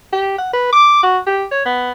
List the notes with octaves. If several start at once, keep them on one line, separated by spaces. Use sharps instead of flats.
G4
F#5
B4
D6
F#4
G4
C#5
B3